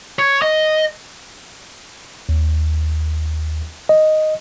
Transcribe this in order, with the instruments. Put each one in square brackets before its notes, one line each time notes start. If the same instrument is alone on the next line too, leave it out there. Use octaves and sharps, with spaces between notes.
[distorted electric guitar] C#5
D#5
[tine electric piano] D#2
D#5